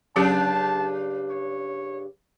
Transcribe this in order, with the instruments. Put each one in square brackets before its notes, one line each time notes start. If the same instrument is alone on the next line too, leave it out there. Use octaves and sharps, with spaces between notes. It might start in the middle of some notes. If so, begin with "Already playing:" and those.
[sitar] G2 C#3 D4 [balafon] F#3 C#4 G4 [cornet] A5
[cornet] C#5